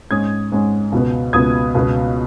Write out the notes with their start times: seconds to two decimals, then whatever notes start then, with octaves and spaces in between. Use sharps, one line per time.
0.11 G#2 G#3 C#4 D#6 G#6
0.52 G#2 G#3 C#4
0.92 C#2 B2 B3
1.33 C#2 B2 B3 D#6 G#6
1.75 C#2 B2 B3